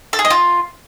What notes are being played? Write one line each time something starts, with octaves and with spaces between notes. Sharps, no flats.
A4
G#4
D#5
F4